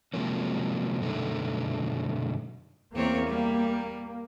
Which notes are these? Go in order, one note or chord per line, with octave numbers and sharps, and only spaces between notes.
C3 F3 F#3 G#3 A#3 C#4
F#2 B2 D3 G3 A3 D#4
E2 A#3 C4 C#5
G3